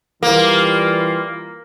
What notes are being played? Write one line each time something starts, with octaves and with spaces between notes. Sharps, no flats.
E3 G3 A#3 F4